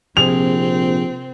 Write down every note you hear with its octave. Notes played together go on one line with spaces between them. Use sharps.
A#1 C3 F3 C4 G#4 F7